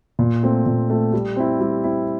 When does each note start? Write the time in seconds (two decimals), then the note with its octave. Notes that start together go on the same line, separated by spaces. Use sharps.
0.19 A#2
0.43 A3 C4
0.66 A#2
0.89 A3 C4
1.13 G3
1.36 C4 E4
1.60 G3
1.84 C4 E4